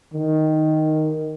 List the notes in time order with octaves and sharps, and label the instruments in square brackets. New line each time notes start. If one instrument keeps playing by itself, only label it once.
[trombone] D#3